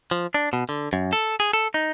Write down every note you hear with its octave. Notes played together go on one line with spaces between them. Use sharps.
F3
D4
B2
D3
F#2
A4
G#4
A4
D#4